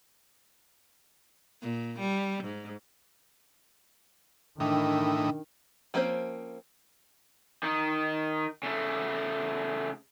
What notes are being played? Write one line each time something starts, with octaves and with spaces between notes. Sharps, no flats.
A#2
G3
G#2
A2 D#3 E3 D4 D#4 G5
F3 A#3 C4 C#4 C5
D#3 D#4
C#3 A3